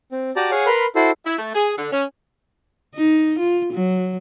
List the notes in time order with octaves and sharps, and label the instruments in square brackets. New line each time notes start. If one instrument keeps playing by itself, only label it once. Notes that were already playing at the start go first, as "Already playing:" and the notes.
[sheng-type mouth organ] C4
F#4 G4 D5 A5 A#5
G#4 C#5 F5 F#5 G#5
A#4 B4 B5 C6 F6
E4 F#4 A4 C5
[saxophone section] E4
A3
G#4
D3
C#4
[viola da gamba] D#4
F4
F#3